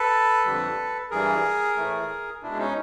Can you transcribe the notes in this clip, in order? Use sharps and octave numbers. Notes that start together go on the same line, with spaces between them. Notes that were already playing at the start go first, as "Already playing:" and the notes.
Already playing: A4 B4
F2 D3 G3
G2 E3 G3 G#4 A#4
A2 E3 A3
B2 G#3 D4 E4
C#4 D#4